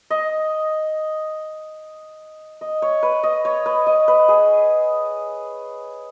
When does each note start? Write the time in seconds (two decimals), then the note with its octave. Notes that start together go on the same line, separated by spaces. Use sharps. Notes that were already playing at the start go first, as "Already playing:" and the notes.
0.10 D#5
2.61 D#5
2.82 C#5
3.03 B4
3.23 D#5
3.45 C#5
3.66 B4
3.87 D#5
4.08 B4
4.28 G#4